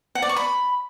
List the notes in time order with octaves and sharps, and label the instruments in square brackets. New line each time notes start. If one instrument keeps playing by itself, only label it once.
[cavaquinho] F#5
D5
C#6
B5